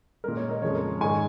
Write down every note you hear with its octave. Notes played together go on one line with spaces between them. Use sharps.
A#2 G#3 A#4
C#5
A#4 D#5
F2 C#3 F3 G#3 C#5
A#4
G#2 D#3 G#3 G#5 C#6